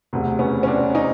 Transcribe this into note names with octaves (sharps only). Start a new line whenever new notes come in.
E1 D2 C3
B3 C#4
C#4
C4 D4
C#4 D#4